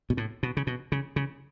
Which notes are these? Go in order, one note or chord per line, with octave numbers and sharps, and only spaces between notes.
B2
A2
B2
C#3
B2
C#3
C#3